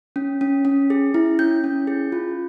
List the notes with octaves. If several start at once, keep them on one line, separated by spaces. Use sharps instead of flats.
C#4
C#4
C#4
G#4
E4
C#4 G6
C#4
G#4
F4